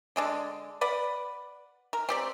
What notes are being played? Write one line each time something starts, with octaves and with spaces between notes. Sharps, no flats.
D3 G#3 D4
B4 D5 F#5
A#4
C4 G4 D5